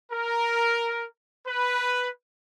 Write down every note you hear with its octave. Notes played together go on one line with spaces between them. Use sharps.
A#4
B4